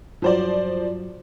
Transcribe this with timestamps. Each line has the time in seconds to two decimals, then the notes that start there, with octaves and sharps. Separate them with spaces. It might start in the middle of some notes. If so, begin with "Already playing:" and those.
0.22 G2 F3 F#3 C5 D5